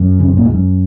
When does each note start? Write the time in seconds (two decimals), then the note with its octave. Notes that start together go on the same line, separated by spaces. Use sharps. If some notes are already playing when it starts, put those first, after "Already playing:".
Already playing: F#2
0.19 C#3
0.28 C3
0.37 A#2
0.45 G#2
0.54 F#2